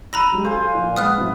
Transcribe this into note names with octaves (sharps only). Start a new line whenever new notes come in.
A#5 B5 E6 F#6 A#6 D#7
F#3 G#3 G4
A4 C5 F5 G#5
A#2 F3 D5
G#3 B3 D#6 F6 F#6
A2 C3 F#3